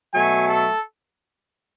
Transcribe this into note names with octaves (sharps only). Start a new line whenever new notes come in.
B2 F#3 A3 G#5
A4